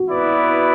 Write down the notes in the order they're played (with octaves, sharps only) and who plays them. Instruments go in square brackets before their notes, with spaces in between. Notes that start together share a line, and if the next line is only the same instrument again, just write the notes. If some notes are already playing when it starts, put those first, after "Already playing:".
Already playing: [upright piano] F#4
[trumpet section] B3 E4 B4 D5